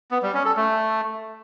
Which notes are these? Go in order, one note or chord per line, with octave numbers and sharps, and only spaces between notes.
B3
G3
C#4
A4
A3